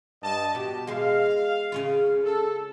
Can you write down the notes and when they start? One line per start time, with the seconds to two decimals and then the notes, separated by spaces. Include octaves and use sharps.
0.23 G2 D#5 A5
0.55 B2 G4
0.87 G#3 F5 C6
1.72 C#3 C#4 F4
2.24 A4